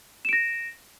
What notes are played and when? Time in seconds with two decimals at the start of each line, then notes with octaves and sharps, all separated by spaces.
0.25 E7
0.29 D7
0.33 A#6